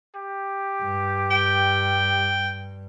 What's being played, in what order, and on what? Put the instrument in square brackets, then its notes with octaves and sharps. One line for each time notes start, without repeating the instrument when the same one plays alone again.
[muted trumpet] G4
[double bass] G2
[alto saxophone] G5